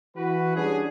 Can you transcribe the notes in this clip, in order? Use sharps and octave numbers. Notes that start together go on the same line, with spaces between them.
E3 F#4 B4
G3 C#4 D4 G#4